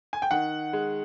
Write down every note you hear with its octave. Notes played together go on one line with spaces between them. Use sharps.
G#5
G5
D#3 F#5
G#3